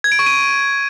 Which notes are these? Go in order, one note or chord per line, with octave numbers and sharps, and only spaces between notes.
G#6
D7
C#6
D#7